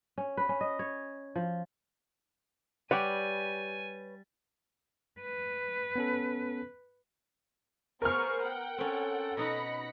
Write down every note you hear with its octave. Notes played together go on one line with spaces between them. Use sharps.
C#4
B4
C#4
D#5
C#5
F3
G3 G4 B4 C#5 F#5 G#5
B4
B3 C#4 A4
B3 G#4 A#4 C5 C#6 F6
F#5 G5
C4 C#4 A4
B2 D#4 F#4 B5 A#6 C#7